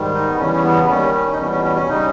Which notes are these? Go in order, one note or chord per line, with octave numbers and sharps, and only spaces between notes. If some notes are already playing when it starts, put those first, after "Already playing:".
Already playing: G#2 D#3 G3
D#4
B3
E2 C#3 E3 G3 C#4
C#4
B3
D#2 D#3 G3 C#4
C#4
D#4
E2 B2 G3 C#4
C#4
C#4
C#4
C#3 G3 D#4